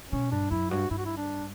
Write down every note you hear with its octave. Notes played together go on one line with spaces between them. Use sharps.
B2 C#4
G2 D4
F#2 E4
G2 F#4
G2 E4
F#4
E4
D4